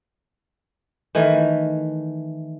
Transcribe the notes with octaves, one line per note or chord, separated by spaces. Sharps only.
D#3 E3 A3